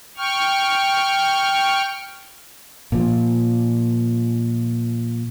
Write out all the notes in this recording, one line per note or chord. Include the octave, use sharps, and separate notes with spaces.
G5 C#6 F6
A#2 F3